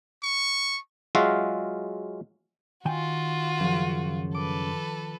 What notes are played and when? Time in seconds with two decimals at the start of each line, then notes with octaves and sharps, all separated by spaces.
0.23 C#6
1.15 F#3 G#3 F4 F#4 E5 F5
2.85 D#3 F4 F#4 G5 G#5
3.60 F#2 C#3 F3
4.34 A4 B4 D6